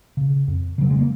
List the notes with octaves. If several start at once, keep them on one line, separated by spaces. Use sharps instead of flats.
C#3
F2
C#3 F#3
G#3
A#3